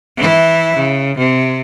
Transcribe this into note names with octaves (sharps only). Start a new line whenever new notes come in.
E3 E4
C#3
C3